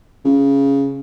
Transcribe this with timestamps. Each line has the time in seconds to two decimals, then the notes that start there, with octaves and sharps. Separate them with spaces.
0.25 C#3